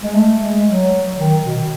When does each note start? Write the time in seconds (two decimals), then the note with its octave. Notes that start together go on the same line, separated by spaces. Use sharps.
0.03 G#3
0.15 A3
0.40 G#3
0.66 F#3
1.18 D#3
1.44 B2